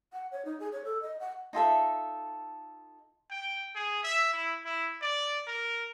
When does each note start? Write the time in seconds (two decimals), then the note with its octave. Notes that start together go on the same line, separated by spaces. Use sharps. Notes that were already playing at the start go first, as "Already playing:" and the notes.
0.13 F#5
0.31 C#5
0.45 D#4
0.60 G#4
0.72 C#5
0.84 A4
1.02 D#5
1.20 F#5
1.53 D#4 F4 A4 E5
3.30 G5
3.75 G#4
4.03 E5
4.33 E4
4.65 E4
5.02 D5
5.47 A#4